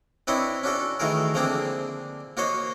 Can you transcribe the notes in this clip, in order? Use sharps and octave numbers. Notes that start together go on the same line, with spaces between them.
C4 D4 E4 B4 C#5 D#5
C#4 D4 F#4 A4
D#3 E3 A3 F#4 G#4 A#4
D3 F3 A#3 C4 D4 G#4
A#3 F#4 C5 C#5 D#5